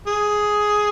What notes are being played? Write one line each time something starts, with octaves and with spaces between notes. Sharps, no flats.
G#4